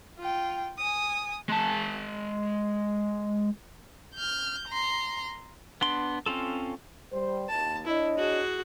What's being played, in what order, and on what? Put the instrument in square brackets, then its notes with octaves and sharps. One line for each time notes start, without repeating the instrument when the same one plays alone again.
[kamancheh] F4 G5
G#5 D#6
[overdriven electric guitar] G#3 A5
[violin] F6 G6
A#5 C6
[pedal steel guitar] B3 D4 C6
C4 C#4 F4 A4
[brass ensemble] G3 C5
[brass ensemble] D#2 [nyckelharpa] A5
[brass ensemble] D4 C#5 D#5 [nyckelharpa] E4
[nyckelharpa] F#4 G#4